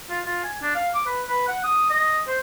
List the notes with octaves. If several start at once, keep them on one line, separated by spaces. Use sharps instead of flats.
F4
F4
G#5
D4
F5
D6
B4
B4
F#5
D#6
D#5
C5